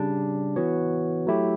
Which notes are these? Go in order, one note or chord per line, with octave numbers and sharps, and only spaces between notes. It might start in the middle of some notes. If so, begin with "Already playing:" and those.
Already playing: C#3 G3 D4
E3 B3 F#4 C#5
F#3 A3 E4 G4